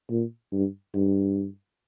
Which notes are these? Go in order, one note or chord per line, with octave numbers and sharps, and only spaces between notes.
A#2
G2
G2